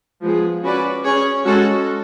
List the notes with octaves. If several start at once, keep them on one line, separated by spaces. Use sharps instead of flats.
F3 G#3 B3 F4 G#4
C#4 F#4 B4 D5
C#4 G#4 C#5
G#3 C#4 F#4 A4